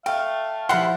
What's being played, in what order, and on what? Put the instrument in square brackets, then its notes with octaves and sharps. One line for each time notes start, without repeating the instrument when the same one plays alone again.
[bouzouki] A3 [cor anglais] F5 [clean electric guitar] G5
[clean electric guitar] F3 A#4 C6 [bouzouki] G3 E4 [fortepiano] F#5